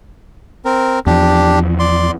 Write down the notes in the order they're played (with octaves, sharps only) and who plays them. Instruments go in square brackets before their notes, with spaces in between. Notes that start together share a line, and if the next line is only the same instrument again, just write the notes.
[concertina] C4 A#4
[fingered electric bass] E2 F3 [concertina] D4 G4
[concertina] D5 C6